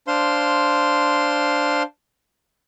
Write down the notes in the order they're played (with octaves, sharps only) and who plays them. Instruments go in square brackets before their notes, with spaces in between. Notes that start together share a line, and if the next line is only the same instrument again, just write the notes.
[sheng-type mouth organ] D4 C5 F5 C6